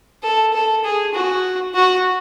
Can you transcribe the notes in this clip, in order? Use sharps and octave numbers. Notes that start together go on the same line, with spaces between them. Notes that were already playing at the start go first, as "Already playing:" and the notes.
A4
A4
G#4
F#4
F#4